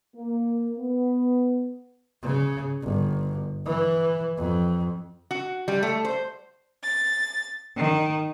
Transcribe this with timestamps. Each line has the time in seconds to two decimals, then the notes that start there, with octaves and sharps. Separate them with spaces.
0.16 A#3
0.79 B3
2.23 C#3
2.83 G1
3.66 E3
4.37 F2
5.31 F#4
5.68 G3
5.83 A3
6.05 C5
6.84 A6
7.75 D#3